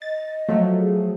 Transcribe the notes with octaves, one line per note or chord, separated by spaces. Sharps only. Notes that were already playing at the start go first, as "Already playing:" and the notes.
D#5 A6
F3 F#3 A3
G#4